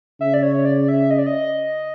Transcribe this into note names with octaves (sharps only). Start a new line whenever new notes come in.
C#3 E5
D5
C#5
D5
E5
D#5
D5
D#5